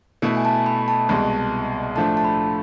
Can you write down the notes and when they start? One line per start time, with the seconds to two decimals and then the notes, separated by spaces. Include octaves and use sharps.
0.22 B2 A3 E4
0.37 G#5
0.45 A5
0.66 B5
0.88 A5
1.09 C2 B2 G#3
1.95 A2 F3 A3 D4 A5
2.17 A5
2.25 B5